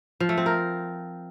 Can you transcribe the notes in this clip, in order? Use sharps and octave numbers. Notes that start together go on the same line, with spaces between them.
F3
A3
C4
A#4